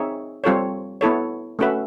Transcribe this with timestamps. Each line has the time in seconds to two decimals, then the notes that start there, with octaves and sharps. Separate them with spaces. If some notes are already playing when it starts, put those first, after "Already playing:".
Already playing: C4 D#4 G#4 C#5 E5
0.44 G3 C4 F4 A4 C#5
1.01 B3 E4 A4 C#5
1.59 A3 C#4 F#4 B4 E5